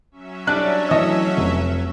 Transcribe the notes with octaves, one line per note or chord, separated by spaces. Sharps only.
F#3 C#4 E5
G3 D4 D5 F#6
E3 A3 D#5
F1